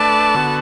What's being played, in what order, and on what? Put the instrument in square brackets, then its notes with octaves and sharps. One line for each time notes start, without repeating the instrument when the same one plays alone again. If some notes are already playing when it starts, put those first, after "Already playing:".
Already playing: [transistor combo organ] A3 D4 B4 D5 [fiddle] A5
[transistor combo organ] D3 B3 F#4